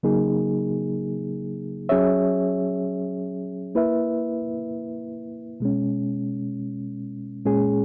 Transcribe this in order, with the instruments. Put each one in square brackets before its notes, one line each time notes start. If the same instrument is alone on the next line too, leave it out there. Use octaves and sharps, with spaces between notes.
[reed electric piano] C#3 F#3 A#3 D#4 G#4
F#3 C#4 G#4 C#5 E5
A#3 E4 B4 E5
B2 G#3 C#4
A#2 G#3 C#4 G#4